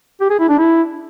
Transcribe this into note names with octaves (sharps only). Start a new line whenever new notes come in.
G4
G#4
E4
D4
E4